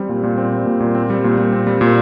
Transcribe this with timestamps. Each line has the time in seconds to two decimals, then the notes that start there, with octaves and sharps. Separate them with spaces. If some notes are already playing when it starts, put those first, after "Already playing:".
Already playing: G3 C4
0.09 A#2
0.23 A#2
0.38 C4
0.52 G3
0.66 A#2
0.80 A#2
0.95 C4
1.10 G3
1.24 A#2
1.38 A#2
1.52 C4
1.67 G3
1.81 A#2